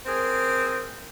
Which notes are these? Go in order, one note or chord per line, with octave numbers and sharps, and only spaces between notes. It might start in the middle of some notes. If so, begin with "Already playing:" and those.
C4 G#4 A#4 C5